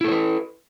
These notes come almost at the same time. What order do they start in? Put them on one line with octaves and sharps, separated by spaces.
E4 A4 C5 B4